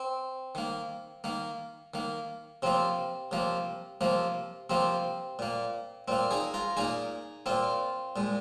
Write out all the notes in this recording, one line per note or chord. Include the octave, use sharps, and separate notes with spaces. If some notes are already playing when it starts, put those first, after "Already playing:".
Already playing: C4
D#3 A#3
D#3 A#3
D#3 A#3
C3 F3 A#3 C4
C3 F3 A#3
C3 F3 A#3
C3 F3 A#3 C4
A#2 A#3
A#2 A#3 C4
D#4 G#4
F4 A#4
A#2 A#3 D#4 G#4
A#2 A#3 C4 F4
A#2 G#3